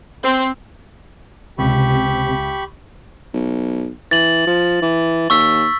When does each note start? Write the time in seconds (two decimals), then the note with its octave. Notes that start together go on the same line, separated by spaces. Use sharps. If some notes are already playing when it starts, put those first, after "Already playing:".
0.23 C4
1.58 C#2 C3 G4 B5 C#6
3.34 B1
4.11 E3 A6 F#7
4.47 F3
4.82 E3
5.30 D#2 C#6 E6 B6